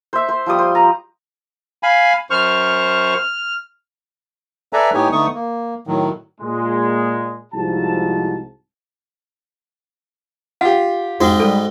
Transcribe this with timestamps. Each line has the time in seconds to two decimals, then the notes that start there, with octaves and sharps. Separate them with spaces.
0.13 C5 E5
0.29 C5
0.46 F3 G3 D#6
0.59 C5
0.75 A#5
1.83 F5 G#5 B5
2.30 F#2 C5 C#6 F6
4.73 A4 B4 D5 E5 G#5 A#5
4.94 A2 B3 D#4 G4 C#5 G#5
5.12 D3 A3 B3 D#4 C#6 D#6
5.35 A#3
5.87 A2 D#3 F#3
6.41 A#2 G#3
7.54 C2 G#2 F3 F#4 A5
10.61 F4 G4 F#5
11.20 F2 G#2 C4 D#4 F#4
11.40 G3 A4